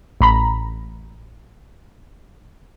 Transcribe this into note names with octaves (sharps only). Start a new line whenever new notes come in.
A1 A#5 B5